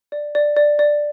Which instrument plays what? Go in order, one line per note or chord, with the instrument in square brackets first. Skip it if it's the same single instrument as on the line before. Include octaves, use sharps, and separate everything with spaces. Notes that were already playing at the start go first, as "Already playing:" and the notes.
[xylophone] D5
D5
D5
D5